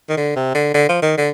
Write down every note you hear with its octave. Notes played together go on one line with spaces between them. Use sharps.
D#3
D3
C3
D3
D3
F3
D#3
D3